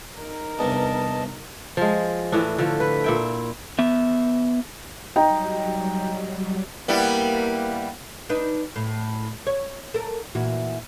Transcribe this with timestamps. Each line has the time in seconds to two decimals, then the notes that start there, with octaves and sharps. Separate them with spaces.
0.16 D#4 A#4
0.59 E2 G2 C3 D#5 A5
1.77 F3 G#3
2.32 A2 E3 D4
2.59 D3 F3 A3
2.80 B4
3.04 A#2 E4 G5
3.79 B3 E5
5.16 F#3 G3 D#4 G5 A#5
6.88 G3 A#3 B3 E4
8.29 D4 D#4 B4
8.76 A2
9.47 C#5
9.94 A4 A#4
10.35 A#2 E3 F#4